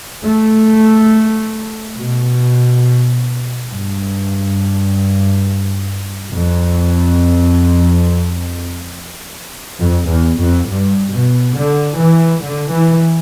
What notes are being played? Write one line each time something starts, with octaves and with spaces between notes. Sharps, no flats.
A3
B2
G2
F2
F2
E2
F2
G2
B2
D3
E3
D3
E3